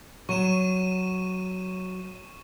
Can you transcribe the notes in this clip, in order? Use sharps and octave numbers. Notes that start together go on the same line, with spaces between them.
F#3 C#6 D#7 E7